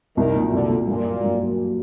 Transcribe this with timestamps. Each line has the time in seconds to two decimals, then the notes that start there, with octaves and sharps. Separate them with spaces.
0.17 C2 D#3
0.35 A#2 F#3
0.52 C2 D3
0.70 A#2 F#3
0.87 G2 A#2
1.06 F#3 A#3
1.23 G2
1.41 F#3 A#3